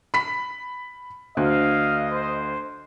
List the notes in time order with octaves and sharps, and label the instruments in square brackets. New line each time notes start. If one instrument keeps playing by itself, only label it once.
[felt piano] B5 B6
[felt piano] D2 [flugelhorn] D#5 [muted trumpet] F5
[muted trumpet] C5